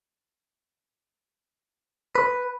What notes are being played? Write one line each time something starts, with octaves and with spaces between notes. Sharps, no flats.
B4